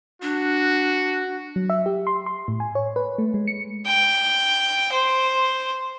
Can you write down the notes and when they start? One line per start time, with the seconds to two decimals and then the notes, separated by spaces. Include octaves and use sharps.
0.22 D4 F#4
1.56 F#3
1.70 E5
1.86 G4
2.07 C6
2.26 C6
2.48 A2
2.60 G#5
2.75 C#5
2.96 B4
3.18 A3
3.34 G#3
3.47 C#7
3.86 G5
4.92 C5